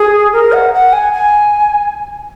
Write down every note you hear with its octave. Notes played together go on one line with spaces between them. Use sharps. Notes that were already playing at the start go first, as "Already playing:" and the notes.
Already playing: G#4
A#4
F#5
F#5
G#5
G#5